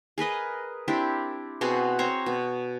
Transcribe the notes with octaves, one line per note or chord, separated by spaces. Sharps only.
G#4 A#4 B4 D#5
C4 D4 E4 G4
B2 C4 F#4 G#4
C4 C5 C#5 A#5
B2